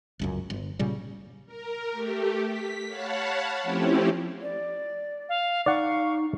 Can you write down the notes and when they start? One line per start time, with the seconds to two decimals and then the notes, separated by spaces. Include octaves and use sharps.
0.19 G1 C#2 F#2
0.50 G1
0.79 A#2 C#3 G3
1.46 A#4
1.91 A3 G4
2.46 B6
2.87 C#5 F5 F#5 A5 B5
3.62 F3 A3 C4 C#4 E4 G4
4.42 D5
5.29 F5
5.66 D#4 D5 F5 F#5 C#6